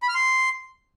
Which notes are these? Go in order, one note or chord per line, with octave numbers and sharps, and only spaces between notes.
B5
F6
C6